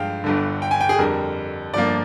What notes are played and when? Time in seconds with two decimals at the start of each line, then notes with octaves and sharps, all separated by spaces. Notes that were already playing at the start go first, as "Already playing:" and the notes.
Already playing: G2 F3 G#3 F5 G5
0.24 G1 G2 D3
0.62 G5
0.71 G#5
0.81 G5
0.89 G#4
0.99 F2 D3 G3 A#4
1.74 G1 G2 F3 A#3 D5